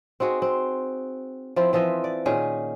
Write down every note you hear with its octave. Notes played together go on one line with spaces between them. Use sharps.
C4 D#4 F#4 G#4
C4
F3 C4 E4
E3 F3 D#5 E5
D5
A#2 D#3 C#4 G#4